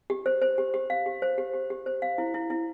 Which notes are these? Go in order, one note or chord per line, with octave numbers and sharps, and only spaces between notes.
G4
C5
C5
G4
G4
F5
G4
C5
G4
G4
G4
C5
F5
E4
E4
E4